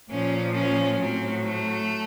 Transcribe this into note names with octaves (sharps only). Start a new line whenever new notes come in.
A#2 F3 C#4
C#4
A2 F#3 C4
A3